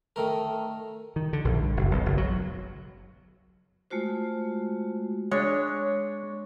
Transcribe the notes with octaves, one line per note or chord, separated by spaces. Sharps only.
D#3 A3 A#4
D#3
D3
A#1
G2
F#1
B1
F#1
F#3
G#3 A3 F4 F#4 C5
G#3 D4 C#5